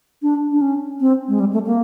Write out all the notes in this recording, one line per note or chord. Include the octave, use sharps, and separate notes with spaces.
D4
D4
C#4
C4
G#3
G3
A3
A#3